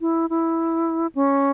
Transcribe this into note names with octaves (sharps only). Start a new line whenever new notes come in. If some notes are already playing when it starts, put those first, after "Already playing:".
E4
E4
C#4